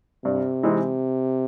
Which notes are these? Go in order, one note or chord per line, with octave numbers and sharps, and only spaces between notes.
G2 C3
E3 G#3 C4 D#4